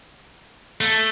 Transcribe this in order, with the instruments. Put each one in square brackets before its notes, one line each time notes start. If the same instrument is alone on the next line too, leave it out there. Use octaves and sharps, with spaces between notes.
[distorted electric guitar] A3